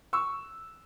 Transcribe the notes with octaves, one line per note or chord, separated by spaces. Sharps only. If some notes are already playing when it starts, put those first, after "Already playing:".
C#6 E6